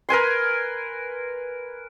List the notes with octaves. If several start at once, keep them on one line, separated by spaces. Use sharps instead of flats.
A#4 B4 G#5 C6